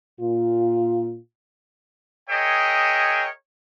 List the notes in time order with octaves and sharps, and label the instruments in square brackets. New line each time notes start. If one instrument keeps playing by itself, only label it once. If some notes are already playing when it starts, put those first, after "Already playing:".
[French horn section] A#2 F4
[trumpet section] G#4 A#4 C#5 D#5 E5 G5